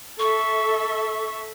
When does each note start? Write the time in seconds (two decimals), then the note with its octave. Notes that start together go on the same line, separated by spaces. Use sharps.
0.19 A4 E5 C#6